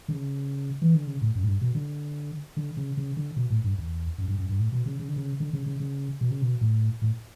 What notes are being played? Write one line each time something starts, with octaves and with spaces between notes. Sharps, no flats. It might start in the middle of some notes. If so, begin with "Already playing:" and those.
D3
C#3
E3
D3
C#3
A2
F#2
A2
G2
B2
D3
D3
C#3
C#3
D3
B2
A2
G2
E2
F#2
G2
F#2
G2
A2
B2
C#3
C#3
D3
C#3
D3
C#3
C#3
C#3
B2
C#3
B2
A2
A2